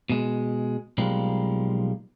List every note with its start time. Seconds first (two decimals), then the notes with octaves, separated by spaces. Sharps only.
0.10 B2 G#3
0.98 B1 F3 G3 G#3 A#3